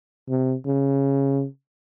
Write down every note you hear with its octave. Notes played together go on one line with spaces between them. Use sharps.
C3
C#3